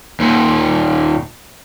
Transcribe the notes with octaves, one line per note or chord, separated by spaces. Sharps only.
D#2 A#2